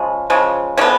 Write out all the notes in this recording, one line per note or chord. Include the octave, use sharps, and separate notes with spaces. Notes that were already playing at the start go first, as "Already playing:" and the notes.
Already playing: C#3 F3 G#3
C#3 F3 G#3
D3 F3 G#3 B3 C#4